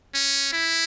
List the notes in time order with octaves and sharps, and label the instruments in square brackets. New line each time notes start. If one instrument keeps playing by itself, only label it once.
[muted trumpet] C#4
E4